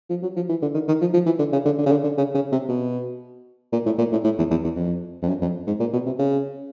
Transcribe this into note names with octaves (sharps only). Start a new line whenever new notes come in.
F3
F#3
F3
E3
D3
D#3
D#3
F3
F3
E3
D3
C#3
D3
D3
C#3
D3
D3
C#3
C#3
C3
B2
A#2
A2
A#2
A2
A2
E2
E2
E2
F2
F2
F#2
F2
G#2
A#2
B2
C3
C#3